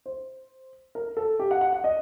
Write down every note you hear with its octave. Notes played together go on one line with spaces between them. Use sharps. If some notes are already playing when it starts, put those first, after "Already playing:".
C5
A#4
A4
G4
F#5
F#5
F#5
D#5